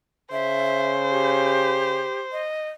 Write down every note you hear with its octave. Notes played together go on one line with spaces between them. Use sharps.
C#3 C5 E5
G4
D#5